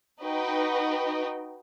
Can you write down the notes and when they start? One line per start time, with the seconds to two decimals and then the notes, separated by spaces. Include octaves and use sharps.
0.22 D#4 F#4 B4 D#5 G5